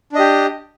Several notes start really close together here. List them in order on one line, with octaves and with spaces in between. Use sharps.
D4 D#5 G4